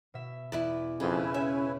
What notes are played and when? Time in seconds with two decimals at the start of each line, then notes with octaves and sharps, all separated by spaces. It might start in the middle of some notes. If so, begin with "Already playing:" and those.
0.14 B2 E5
0.52 E2 E4 B4 D5
1.00 F2 C#3 E4 B4 G#5 A5
1.34 C#4 C#5 E5 G5